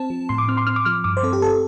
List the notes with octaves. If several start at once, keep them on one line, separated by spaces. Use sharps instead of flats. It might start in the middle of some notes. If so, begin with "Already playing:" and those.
Already playing: C4 A5
F3
A2 C6
D6
C4 F6
C6
C4 F6
D6
F3 F6
G2 D6
C5
C4 A4
G4
C4 A4